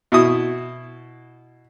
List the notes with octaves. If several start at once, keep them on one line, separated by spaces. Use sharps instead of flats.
B2 E4 D#6